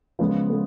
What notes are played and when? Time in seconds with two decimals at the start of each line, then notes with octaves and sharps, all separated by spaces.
0.19 C#3 F3 G#3 B3
0.50 G#3 B3